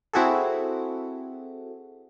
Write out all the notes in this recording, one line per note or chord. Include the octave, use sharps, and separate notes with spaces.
C4 E4 F#4 G#4 A4